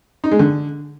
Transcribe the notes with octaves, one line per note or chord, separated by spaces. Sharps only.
D#4
G#3
D3